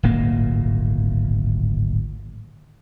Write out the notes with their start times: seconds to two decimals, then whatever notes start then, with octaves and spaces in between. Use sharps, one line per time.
0.03 D1 G#1 A#2 A#3